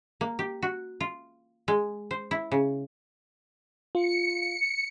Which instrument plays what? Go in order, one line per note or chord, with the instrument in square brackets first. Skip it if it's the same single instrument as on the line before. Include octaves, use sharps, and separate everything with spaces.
[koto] A#3
G4
F#4
F4
G#3
C5
E4
C#3
[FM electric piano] F4 [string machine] C#7